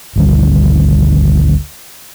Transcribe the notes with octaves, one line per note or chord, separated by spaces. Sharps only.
G#1 D2 G3